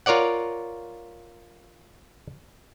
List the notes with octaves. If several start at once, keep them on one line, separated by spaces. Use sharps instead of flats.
F4 A#4 C#5 D5 F#5